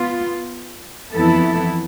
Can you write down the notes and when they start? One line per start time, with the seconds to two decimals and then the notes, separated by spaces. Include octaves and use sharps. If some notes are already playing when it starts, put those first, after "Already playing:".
Already playing: B3 F4
1.13 F2 E3 B3 E4 A4